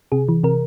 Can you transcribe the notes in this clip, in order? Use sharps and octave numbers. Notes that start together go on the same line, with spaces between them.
C3 G#4
E3
C3 A#4